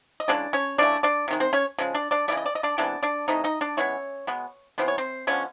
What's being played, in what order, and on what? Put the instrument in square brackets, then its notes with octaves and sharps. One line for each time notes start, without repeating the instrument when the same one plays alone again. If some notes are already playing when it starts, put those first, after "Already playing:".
[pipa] D#5
C#3 E3 G#3 D4 D5
C#4 C#5
C#3 E3 A3 D4 D5
D4 D5
C3 D#3 G#3
C4 C5
C#4 C#5
C#3 F3 G#3
D4 D5
D4 D5
C#3 E3 A3 D5
D#5
D5
D#5
D4 D5
C3 E3 G#3 B3 D4 D5
D4 D5
C3 E3 A3 D#4 D#5
D#4 D#5
D4 D5
E3 G#3 B3 C#4 C#5
B2 G#3 B3
C3 E3 G3 B3 C5
C#5
C4 C5
D3 F3 G#3 B3 C#4 C#5